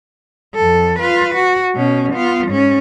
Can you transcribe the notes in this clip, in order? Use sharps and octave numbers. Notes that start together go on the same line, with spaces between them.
F2 A4
F4 B4
F#4
B2 C#4
B3 F4
G#2 C#4